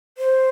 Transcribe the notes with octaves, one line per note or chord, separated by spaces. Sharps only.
C5